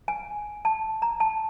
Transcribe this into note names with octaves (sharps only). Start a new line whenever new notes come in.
G#5
A5
A#5
A5